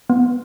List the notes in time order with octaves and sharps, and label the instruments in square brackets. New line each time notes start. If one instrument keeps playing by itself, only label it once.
[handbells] B3